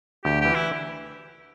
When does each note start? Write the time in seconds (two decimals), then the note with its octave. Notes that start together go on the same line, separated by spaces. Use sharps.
0.25 D2 G4
0.41 E3 G4
0.55 E4